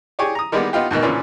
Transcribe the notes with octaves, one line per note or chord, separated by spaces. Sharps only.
G4 G#4 C#5 D5
A#5 D#6
D#3 G3 G#3 A#3 B3
B3 D#4 F4 G4
D2 G#2 B2 D#3
A#2 C#3 E3 C#4 D4